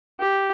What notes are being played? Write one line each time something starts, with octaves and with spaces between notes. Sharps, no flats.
G4